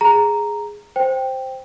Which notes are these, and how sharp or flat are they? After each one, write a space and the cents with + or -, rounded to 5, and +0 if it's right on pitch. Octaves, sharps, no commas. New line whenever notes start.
G#4 +0 A#5 +0
C5 +0 G5 +0